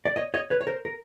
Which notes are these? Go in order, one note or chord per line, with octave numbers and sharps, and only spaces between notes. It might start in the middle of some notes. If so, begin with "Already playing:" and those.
D5
C#5 D#5
C#5 D#5
B4 C#5
C#5
A#4 C5
A#4